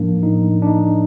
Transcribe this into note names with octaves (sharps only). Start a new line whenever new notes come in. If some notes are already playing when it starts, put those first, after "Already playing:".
Already playing: A2 F3 A#3 D4
D#4
D4
D#4